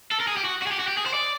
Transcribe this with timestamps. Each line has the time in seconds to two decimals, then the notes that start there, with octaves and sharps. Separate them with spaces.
0.11 A4
0.20 A#4
0.28 G#4
0.37 G4
0.45 F#4
0.62 F#4
0.67 G#4
0.72 G4
0.79 F#4
0.88 G4
0.97 G#4
1.06 C5
1.14 D5